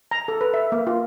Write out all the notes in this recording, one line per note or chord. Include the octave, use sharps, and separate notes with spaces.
A#5
A4
B4
E5
A#3
F4